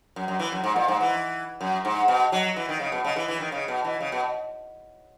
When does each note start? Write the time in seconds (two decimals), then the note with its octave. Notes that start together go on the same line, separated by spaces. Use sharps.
0.16 F#2
0.28 F#2
0.39 E3
0.52 F#2
0.64 G#2
0.76 A#2
0.88 G#2
1.01 E3
1.61 F#2
1.85 G#2
2.08 B2
2.32 F#3
2.56 E3
2.69 D#3
2.80 C#3
2.92 B2
3.05 C#3
3.16 E3
3.28 E3
3.40 D#3
3.52 C#3
3.68 B2
3.84 E3
4.01 C#3
4.12 B2